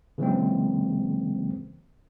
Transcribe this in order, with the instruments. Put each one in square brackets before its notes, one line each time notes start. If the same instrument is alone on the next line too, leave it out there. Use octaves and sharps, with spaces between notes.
[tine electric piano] C#3 E3 F#3 G#3 A#3 C4